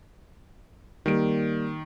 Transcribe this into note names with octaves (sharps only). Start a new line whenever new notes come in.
D#3 G3 A#3 D7